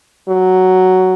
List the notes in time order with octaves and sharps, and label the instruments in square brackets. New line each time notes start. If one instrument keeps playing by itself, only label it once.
[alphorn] F#3